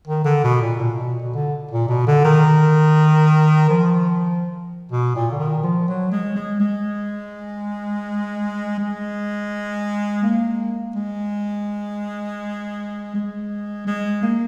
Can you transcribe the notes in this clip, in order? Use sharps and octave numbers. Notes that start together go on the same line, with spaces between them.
D#3
D3
B2
A#2
A#2
B2
B2
D3
A#2
B2
D3
D#3
F3
B2
A#2
D3
D#3
F3
F#3
G#3
G#3
G#3
G#3
A#3
G#3
G#3
G#3
A#3